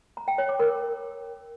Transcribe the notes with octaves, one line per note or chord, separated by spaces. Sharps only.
A#5
G5
C#5
D6
A#4